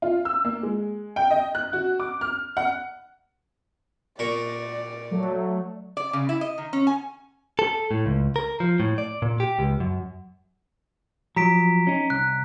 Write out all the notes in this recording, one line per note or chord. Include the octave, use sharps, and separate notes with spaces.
F4
E6
A#3
G#3
G5
D#5
F#6
F#4
D6
F6
F#5
A#2 A#4 D5 C#6
F#3 A3
D5
C#3
E4
D#5
D#3
C#4
G#5
A4
A2
C#2
A#4
F3
A2
D5
A#2
G4
C#2
F#2
F3 F#3 A#5 B6 D7
C#4 D#4
C2 F#6